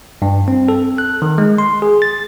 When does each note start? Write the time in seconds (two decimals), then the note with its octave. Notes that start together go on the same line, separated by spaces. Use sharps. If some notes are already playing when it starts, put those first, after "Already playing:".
0.22 G2
0.48 C4
0.68 A4
0.98 F#6
1.22 D#3
1.38 G#3
1.58 C6
1.82 G#4
2.02 A6